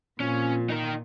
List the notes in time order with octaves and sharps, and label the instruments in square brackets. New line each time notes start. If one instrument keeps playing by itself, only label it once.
[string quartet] A#2 [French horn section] F3 C4 F4 [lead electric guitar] C#4
[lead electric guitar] D#4 A#4